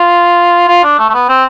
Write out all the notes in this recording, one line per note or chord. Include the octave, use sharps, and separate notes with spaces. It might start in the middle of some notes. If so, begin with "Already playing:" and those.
Already playing: F4
F4
D4
A3
A3
B3
C4